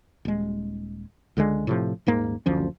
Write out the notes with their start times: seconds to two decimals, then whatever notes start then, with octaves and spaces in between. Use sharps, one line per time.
0.25 D#1 G#3
1.37 C#2 D3 D#3 G#3
1.67 A2 C3 F3
2.06 D#1 G#2 A#3
2.46 F#1 D2 F3 C#4